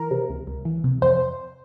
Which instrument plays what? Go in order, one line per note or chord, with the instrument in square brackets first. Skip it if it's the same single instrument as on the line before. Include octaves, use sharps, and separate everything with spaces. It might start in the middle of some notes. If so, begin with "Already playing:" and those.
Already playing: [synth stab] E3 A#4
C3
C#2
C#2
E3
C3
F2 C5